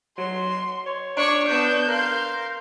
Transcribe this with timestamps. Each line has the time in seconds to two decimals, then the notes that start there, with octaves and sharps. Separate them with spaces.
0.18 F#3 C6
0.86 C#5
1.17 D4 C#5 D5 C#6
1.48 B3 A5 G6
1.88 A#4 F5 C6